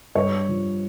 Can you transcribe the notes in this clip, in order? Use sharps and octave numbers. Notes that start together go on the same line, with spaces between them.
G2 C#5
F3